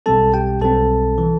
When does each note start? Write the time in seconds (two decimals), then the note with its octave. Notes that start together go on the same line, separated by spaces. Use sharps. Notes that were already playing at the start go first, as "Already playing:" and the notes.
0.06 B1 B2 G3 C4 A4 A5
0.34 G4 G5
0.61 B1 B2 G3 C4 A4 A5
1.18 E3